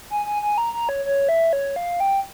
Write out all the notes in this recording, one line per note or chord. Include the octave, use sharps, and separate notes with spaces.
G#5
G#5
G#5
A#5
A#5
C#5
C#5
E5
C#5
F5
G5